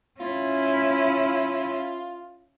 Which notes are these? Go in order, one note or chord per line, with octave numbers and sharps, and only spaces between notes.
C#4 E4 F4